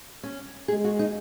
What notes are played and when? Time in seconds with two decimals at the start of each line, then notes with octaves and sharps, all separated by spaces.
0.23 C#4
0.68 G#3 G#4
0.84 F#4
0.99 D#4